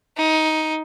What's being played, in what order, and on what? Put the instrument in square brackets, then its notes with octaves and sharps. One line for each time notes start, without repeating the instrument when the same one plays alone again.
[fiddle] D#4